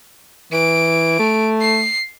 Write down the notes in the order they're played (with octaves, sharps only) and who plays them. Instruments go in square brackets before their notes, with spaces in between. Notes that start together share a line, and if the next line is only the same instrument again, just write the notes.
[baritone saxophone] E3 [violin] D7
[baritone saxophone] A3
[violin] C7